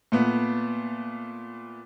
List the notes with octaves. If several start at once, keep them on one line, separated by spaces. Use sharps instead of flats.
A#2 A3 B3